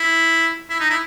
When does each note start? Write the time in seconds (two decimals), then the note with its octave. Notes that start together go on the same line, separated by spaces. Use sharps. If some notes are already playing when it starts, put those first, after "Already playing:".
Already playing: E4
0.70 E4
0.80 D#4
0.90 E4